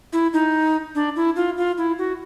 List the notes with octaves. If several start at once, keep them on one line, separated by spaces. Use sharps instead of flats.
E4
D#4
D4
E4
F4
F4
E4
F#4